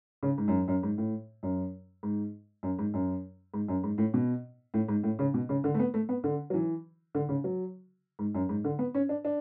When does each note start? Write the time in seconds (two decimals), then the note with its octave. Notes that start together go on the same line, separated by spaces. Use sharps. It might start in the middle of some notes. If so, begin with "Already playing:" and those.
0.23 C#3
0.38 G#2
0.48 F#2
0.68 F#2
0.83 G#2
0.98 A2
1.43 F#2
2.03 G#2
2.63 F#2
2.79 G#2
2.94 F#2
3.54 G#2
3.68 F#2
3.84 G#2
3.98 A2
4.14 B2
4.74 A2
4.88 G#2
5.04 A2
5.19 C#3
5.34 B2
5.49 C#3
5.64 D3
5.74 A3
5.79 B3
5.94 A3
6.09 B3
6.24 D3
6.50 F#3
6.54 E3
7.15 D3
7.29 C#3
7.44 F#3
8.19 G#2
8.35 F#2
8.49 G#2
8.64 D3
8.79 B3
8.95 C#4
9.09 D4
9.25 D4